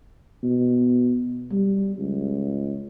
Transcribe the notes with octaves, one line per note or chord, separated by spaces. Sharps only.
B2
G3
C#2